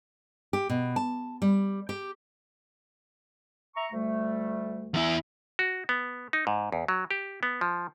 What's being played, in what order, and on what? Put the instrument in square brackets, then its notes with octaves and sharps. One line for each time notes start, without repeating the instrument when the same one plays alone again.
[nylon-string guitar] G4
B2
A5
G3
G4
[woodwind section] E5 A#5 C#6
D2 G3 A3
[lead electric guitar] E2 E4
[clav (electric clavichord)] F#4
B3
D#4
G#2
E2
F#3
G4
B3
F3